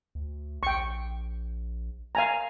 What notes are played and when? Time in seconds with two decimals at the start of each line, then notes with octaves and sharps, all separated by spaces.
0.15 D2
0.63 A#1 G5 C#6
2.15 F5 G#5 A#5